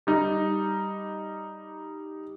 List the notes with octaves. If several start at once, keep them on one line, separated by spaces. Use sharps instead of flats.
G3 D#4